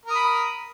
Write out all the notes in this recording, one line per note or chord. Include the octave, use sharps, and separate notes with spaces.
A#4 B5 D#6